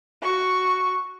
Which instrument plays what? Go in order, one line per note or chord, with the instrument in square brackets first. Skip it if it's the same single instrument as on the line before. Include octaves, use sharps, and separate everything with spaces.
[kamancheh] F#4 C#6